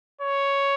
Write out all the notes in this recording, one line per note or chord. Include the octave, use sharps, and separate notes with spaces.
C#5